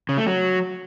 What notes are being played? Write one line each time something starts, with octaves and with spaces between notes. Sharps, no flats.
C#3
A3
F#3